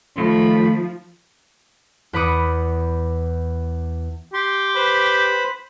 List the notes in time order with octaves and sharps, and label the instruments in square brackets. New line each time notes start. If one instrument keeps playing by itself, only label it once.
[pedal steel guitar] D#3 A3 [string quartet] F3 [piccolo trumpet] B5
[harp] E2 B4 B5 D6 D#6 C#7
[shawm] G4 [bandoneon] C6
[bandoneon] B4 C5 B5